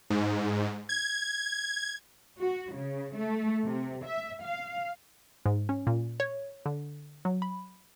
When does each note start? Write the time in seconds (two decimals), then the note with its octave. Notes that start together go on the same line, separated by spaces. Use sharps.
0.10 G#2
0.89 G#6
2.41 F#4
2.75 C#3
3.16 A3
3.66 C3
4.06 E5
4.43 F5
5.46 G#2
5.69 C#4
5.87 A#2
6.20 C#5
6.66 D3
7.25 F#3
7.42 B5